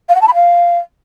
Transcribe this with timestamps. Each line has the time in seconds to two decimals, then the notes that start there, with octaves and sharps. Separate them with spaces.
0.08 F5
0.15 F#5
0.21 A5
0.27 B5
0.34 F5